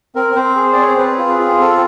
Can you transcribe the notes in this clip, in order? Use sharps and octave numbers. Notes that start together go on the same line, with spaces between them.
C4 A#4
C4 C5
G#4
D5
C4 C#5
C5
C4 B4
F4
G#4
F4
C4 A4